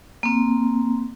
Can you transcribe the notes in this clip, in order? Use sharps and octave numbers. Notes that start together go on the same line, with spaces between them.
A#3 C4